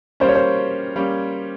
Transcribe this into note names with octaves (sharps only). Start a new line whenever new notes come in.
G3 A#3 C#4 C5
C#5
C5
G3 A#3 C#4